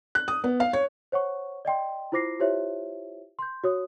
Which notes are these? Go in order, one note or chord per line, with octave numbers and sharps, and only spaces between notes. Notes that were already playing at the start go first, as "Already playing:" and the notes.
F#6
D#6
B3
F5
C#5
C5 C#5 F#5 C#6
D5 D#5 G5 C6
E4 F4 C5 D6 A#6 C7
E4 F4 G4 C5 C#5 E5
C6 G6
F#4 C#5 D#6